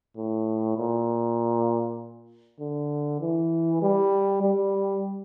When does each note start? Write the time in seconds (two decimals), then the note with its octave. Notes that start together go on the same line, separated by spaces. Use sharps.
0.16 A2
0.77 A#2
2.60 D3
3.21 E3
3.82 G3
4.42 G3